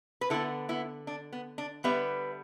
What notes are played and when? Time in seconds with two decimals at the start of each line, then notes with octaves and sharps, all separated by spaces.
0.21 B4
0.30 D3 B3 E4 A4
0.69 B3 E4
1.07 D4
1.33 B3
1.58 D4
1.84 D3 G3 B3 B4 E5